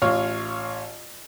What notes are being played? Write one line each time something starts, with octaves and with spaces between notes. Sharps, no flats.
A1 F4 C#5 F5